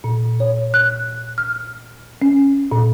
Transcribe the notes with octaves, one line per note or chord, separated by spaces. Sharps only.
A#2
C#5
F#6
F6
C#4
A#2